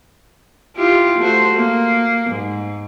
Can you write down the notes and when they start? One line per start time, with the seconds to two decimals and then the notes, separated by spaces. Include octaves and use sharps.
0.76 E4 F4 G4
1.18 A3 F#4 C5
1.54 A#3
2.30 G#2